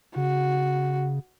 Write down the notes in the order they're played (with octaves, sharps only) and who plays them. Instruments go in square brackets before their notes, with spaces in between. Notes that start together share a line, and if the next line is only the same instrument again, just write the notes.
[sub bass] C#3 [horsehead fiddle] F#4